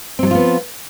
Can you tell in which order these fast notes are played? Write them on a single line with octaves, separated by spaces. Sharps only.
C4 F#3 F3 F4 B3